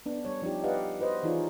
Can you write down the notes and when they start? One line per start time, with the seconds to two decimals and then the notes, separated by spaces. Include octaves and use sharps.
0.06 B3 D4
0.25 G3 C#5
0.42 F3 D4 D#4 G4
0.64 G4 B4 D5 D#5 F5 F#5
1.00 F#4 B4 C5 D#5
1.23 E3 D#4 F4 G#4 C#5 D5